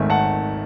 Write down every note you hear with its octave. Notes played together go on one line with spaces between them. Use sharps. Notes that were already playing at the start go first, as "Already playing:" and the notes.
Already playing: G#1 G#2 D#3 A3 E5 G#5
F#5 A5